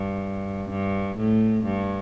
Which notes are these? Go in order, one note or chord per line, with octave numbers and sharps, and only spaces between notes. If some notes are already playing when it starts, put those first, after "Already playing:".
Already playing: G2
G2
A2
G2